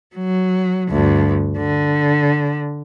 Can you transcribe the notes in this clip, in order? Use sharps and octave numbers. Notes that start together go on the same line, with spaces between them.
F#3
D2 G2
D3